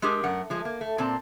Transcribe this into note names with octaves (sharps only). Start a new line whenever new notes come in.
G#3 D4 G4 G#4 A#4
F#2 A3 A#4 F#5
F3 G#3 A3
A#3
A3
A#2 C4 D5 A5